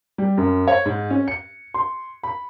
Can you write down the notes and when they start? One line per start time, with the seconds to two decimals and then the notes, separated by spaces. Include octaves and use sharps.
0.18 G3
0.37 F#2
0.68 C#5
0.85 G#2
1.10 C#4
1.28 C#7
1.74 C6
2.23 B5